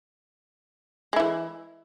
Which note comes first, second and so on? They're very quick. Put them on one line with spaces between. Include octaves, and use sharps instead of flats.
G#3 E4 E3